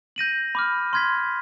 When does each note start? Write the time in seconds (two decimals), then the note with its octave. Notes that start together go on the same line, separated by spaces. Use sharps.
0.16 G6 A#6 D#7 F#7
0.55 B5 D6 F6
0.93 C6 F6 G#6 B6